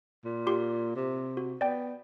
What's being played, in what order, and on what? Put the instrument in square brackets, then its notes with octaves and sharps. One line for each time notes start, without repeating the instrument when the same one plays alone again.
[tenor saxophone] A#2
[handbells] F4 G4 C6
[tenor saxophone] C3
[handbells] F#4
[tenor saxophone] B3 [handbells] D5 G5